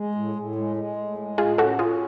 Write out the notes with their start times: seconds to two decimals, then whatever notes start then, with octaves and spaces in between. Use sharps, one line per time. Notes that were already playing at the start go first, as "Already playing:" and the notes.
Already playing: G#3
0.15 A2
0.36 A2
0.56 G#3
0.76 G#3
0.96 A2
1.18 G#3
1.38 A2 F4 G#4
1.58 C#4 F#4 A4
1.79 C#4 F4 G#4